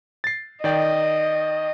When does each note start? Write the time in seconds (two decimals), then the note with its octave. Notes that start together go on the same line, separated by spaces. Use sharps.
0.24 A6 C7
0.64 D#3 D5 D#5 G5